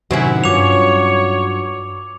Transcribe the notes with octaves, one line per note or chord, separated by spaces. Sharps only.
A2 C3 D#3 F#3 C4 C#4 E4
G2 F4 C#5 D6 F7